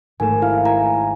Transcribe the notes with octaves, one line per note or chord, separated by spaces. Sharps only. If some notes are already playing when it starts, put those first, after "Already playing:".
G#1 A3 G#5 E7
E4 F5
G#5 A#5